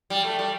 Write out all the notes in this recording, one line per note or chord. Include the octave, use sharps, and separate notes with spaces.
G3
A3
G3